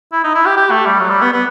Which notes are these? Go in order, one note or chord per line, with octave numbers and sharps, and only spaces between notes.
E4
D#4
E4
G4
G4
A3
G3
F#3
G3
B3
B3